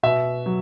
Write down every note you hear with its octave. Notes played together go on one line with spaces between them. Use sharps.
B2 E5
F#3